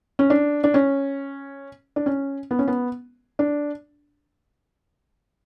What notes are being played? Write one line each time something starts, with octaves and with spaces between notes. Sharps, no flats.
C#4
D4
D4
C#4
D4
C#4
B3
C#4
B3
D4